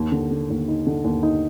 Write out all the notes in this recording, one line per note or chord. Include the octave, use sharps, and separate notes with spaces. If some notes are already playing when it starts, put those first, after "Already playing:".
Already playing: D#2
D3
D3
D#2
D#4
D3
D#2
D#4